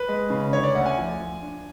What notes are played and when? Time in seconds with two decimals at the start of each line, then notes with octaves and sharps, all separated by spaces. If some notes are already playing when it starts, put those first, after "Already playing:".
Already playing: B4
0.09 G#3
0.30 C#3
0.53 D3 C#5
0.63 D5
0.75 D2 F#5
0.86 G#5
0.98 F3
1.20 F3
1.42 D4